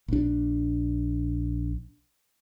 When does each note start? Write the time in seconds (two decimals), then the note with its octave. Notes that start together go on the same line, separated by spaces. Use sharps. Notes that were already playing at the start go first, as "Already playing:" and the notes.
0.08 A#1 D4